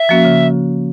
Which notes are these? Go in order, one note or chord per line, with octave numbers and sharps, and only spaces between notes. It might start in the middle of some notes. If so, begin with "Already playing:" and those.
Already playing: E5
F3 A#3 C#4 F#4
C#3